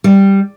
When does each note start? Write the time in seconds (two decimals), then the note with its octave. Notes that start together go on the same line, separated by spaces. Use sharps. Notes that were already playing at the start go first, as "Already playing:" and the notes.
0.04 G3